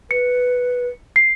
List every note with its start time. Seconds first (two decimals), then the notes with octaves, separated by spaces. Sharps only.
0.11 B4 C#7
1.16 C7